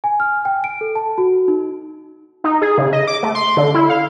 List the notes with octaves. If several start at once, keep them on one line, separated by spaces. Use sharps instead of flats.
G#5
F6
G5
D7
A4
A5
F#4
D#4
D#4
G#4
C#3
D#5
D6
A3
C6
D3
E4
F5